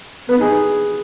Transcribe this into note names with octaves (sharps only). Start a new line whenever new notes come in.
B3 B4
D#4 G#4